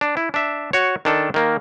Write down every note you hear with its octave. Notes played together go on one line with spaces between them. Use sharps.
D4
E4
D4 E5
F#4 C#5
D#3 D4 A4
D#3 A#3